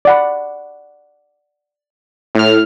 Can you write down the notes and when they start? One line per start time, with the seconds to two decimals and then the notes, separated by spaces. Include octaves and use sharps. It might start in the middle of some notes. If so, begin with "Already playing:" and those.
0.05 D5 F#5 B5
2.35 A2 F6